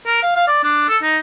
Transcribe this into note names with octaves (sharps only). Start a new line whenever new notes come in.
A#4
F5
F5
D5
D4
A4
D#4